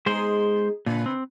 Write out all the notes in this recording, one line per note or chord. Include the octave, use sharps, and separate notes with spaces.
G#3 B3 D#4 G#4 C5
A#2 C#3 B4
C4